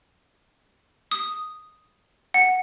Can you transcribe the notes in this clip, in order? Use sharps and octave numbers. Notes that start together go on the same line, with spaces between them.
D#6
F#5